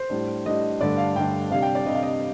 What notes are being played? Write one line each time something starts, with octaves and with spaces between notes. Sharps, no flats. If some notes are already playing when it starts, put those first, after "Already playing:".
Already playing: C5
A2 G3 D4
A2 G3 D4 D#5
G2 D3 A3 D4 D5
F5
G2 D3 A3 D4 G5
C3 G3 D4 F5
G5
D5
C3 G3 D4 D#5
F5
D#5